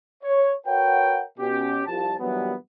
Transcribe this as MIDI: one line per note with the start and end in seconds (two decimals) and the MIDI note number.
0.23 0.51 73
0.66 1.23 66
0.66 1.23 70
0.66 1.23 71
0.66 1.23 73
0.66 1.23 78
0.66 1.23 79
1.38 1.81 47
1.38 1.81 61
1.38 1.81 67
1.86 2.14 36
1.86 2.14 53
1.86 2.14 81
2.19 2.53 43
2.19 2.53 46
2.19 2.53 52
2.19 2.53 54
2.19 2.53 55
2.19 2.53 59